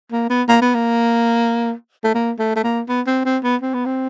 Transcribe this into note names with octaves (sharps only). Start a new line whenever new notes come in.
A#3
B3
A#3
B3
A#3
A3
A#3
A3
A3
A#3
B3
C4
C4
B3
C4
B3
C4